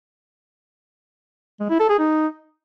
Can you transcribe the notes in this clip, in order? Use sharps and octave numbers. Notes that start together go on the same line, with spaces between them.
G#3
E4
A4
G#4
D#4